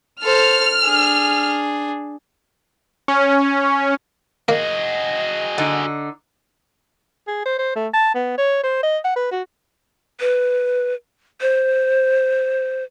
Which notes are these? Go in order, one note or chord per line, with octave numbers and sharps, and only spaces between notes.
A4 C5 F6
D4 G#4
C#4
A#3 F#4 G#4 D#5
D3 D#4
G#4
C5
C5
A3
A5
B3
C#5
C5
D#5
F#5
B4
F#4
B4
C5